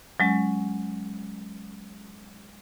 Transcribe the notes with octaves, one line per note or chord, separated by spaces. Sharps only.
F#3 G#3 C#4